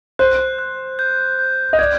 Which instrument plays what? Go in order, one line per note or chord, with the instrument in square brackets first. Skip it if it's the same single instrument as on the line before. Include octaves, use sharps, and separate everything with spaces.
[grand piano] C5 [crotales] F#6
[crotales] F#6
G6
G6
[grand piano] D#5
[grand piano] D5 [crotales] G#6